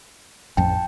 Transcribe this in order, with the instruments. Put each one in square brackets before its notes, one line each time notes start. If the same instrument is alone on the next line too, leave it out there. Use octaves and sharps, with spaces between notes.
[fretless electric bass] A1 F2 F3 [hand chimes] G5 [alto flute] A5